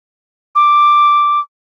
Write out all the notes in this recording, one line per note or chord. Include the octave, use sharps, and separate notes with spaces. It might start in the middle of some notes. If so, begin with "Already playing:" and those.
D6